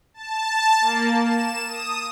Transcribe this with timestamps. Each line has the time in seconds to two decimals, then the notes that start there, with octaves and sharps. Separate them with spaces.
0.14 A5
0.81 A#3
1.21 E7
1.67 D#6